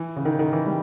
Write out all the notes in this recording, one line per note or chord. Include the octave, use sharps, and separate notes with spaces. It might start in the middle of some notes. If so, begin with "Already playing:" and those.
Already playing: E3
C#3
D#3
D#3
E3
G3